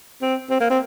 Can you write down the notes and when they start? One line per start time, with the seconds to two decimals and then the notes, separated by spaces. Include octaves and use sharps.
0.22 C4
0.50 C4
0.61 A#3
0.70 C4